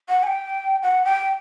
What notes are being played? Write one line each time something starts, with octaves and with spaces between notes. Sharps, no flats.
F#5
G#5
G5
F#5
G5